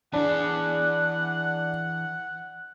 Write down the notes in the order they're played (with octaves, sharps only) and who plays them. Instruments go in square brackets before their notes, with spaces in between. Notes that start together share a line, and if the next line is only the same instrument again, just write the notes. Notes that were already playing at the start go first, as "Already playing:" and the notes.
[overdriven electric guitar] E3 G#4 [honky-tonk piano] D4 [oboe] F#5